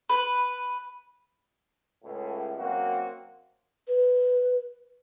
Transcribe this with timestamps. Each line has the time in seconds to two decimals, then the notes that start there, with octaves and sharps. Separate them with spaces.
0.09 B4
2.04 C#2 A2
2.58 F#2 A#3 C4 F#4
3.87 B4